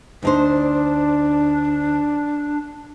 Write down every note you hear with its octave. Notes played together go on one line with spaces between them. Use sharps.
D2 D4 D#4 C5